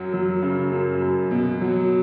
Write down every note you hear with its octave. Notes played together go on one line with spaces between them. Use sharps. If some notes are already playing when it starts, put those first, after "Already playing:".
Already playing: F#2 F#3
F#3
C#3
F#2
F#2
B2
F#3